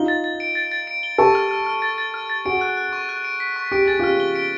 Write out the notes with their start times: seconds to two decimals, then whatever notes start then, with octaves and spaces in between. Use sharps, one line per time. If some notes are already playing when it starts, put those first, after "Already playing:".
Already playing: D#4 F4 G7
0.08 A6
0.24 A6
0.40 D7
0.55 A6
0.71 A6
0.87 D7
1.03 G7
1.18 G4 A4 C#6
1.35 F6
1.51 F6
1.66 F6
1.82 A6
1.98 A6
2.14 F6
2.30 A6
2.45 F#4 G#4 D7
2.61 F#6
2.77 F#6
2.93 C#6
3.09 F#6
3.24 D7
3.40 B6
3.56 C#6
3.72 G4 D7
3.86 G#4 A6
3.99 F4 G4 F6
4.20 G7
4.35 D7